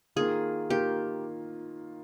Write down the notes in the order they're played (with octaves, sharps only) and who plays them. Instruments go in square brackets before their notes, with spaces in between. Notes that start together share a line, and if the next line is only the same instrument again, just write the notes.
[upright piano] D#3 A#3 F4 [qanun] G#4
[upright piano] D#3 A#3 F4 [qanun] G4